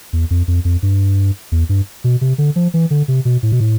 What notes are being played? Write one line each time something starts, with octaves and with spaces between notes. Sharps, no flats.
E2
F2
F2
F2
G2
E2
G2
B2
C3
D3
F3
E3
D3
C3
B2
A2
B2
A2